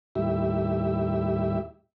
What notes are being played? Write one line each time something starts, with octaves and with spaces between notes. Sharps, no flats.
D#2 A2 G3 E4 G4 E5